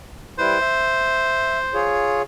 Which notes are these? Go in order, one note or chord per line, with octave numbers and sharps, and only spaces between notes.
G3 E4 B4 C5
E5
F4 G#4 C#5